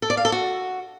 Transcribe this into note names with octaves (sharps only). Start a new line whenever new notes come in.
A4
D5
F5
A4
F#4